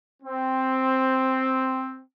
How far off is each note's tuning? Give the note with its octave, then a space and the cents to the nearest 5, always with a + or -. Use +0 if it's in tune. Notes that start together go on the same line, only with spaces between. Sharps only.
C4 +0